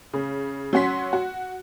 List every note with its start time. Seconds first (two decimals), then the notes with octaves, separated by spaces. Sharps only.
0.14 C#3
0.73 F#3 C#4 F#4 C6 B6
1.13 F#4